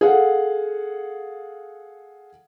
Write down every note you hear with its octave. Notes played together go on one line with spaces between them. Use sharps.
G#4 A4 F5 F#5